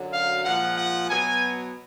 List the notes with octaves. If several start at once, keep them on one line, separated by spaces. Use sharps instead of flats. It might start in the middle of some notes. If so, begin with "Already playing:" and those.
Already playing: F#2 D3 F#3
F5
A#2 F3 G#3 F#5
F#5
B2 F#3 B3 G#5